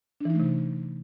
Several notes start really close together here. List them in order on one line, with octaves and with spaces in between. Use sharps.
D4 E3 D#4 A3 C3